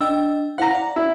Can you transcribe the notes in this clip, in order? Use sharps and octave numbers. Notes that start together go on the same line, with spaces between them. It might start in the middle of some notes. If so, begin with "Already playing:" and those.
D4 D#5 G5 E6
E4 C5 F5 F#5 A#5
D5
E4